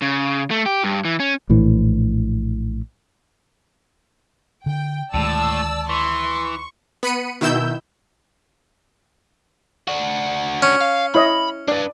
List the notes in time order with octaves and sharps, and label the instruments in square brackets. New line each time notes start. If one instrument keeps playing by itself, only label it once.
[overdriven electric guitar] C#3
A3
G4
G2
E3
C#4
[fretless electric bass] A#1 A2 E3
[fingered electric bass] D3 [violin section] G5
[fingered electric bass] D2 D#3 G#3 [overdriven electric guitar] A2 [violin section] D5 A5 E6
[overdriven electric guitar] E3 [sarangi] C6 [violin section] C#6
[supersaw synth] B3 B5 C#7 D#7
B2 D#3 E4 E6 G6
[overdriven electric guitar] D4 F#4
[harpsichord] C#4
[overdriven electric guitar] F5
[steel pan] E4 C#5 D#5 [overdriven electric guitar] B5
[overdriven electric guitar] D4 B4 [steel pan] D5